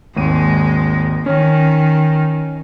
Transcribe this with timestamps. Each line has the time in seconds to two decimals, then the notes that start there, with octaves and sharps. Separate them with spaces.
0.16 G#1 D#2 G#3 D#7
1.26 D#3 C#4